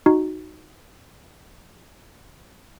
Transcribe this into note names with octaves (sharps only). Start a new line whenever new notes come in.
D#4 F#4